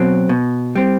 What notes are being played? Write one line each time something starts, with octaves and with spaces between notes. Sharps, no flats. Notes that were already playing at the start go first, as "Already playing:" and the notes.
Already playing: B2 F#3 C4
B2
G3 C4